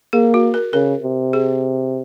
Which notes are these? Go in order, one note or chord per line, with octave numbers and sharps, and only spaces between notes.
A#3 G#4
F#4
A#4
C#3 A#4
C3
G#4